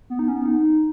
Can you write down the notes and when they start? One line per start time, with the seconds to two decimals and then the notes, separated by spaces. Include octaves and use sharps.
0.10 B3
0.19 D#4
0.28 C#4
0.36 B3
0.45 D#4